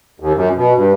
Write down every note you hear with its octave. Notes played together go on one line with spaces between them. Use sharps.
D#2
F#2
B2
G2